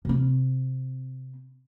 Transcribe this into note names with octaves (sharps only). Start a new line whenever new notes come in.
C3 C4